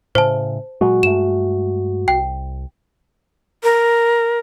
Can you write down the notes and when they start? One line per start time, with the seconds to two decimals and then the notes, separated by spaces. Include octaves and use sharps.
0.15 A2 C#3 C5 A5
0.81 A#2 F#3 G#3 F#4
1.03 G2 G#3 A3 E7
2.08 C2 G5
3.63 A#4